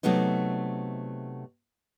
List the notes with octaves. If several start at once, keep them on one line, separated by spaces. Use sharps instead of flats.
C3 F#3 A3 B3 D#4